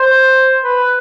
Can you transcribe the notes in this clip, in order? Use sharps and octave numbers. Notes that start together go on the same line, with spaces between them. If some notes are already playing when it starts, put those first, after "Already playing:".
Already playing: C5
B4